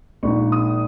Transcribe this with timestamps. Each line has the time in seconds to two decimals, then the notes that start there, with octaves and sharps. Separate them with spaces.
0.23 A#1 A#2 G#3 D#4 C#6
0.52 D#6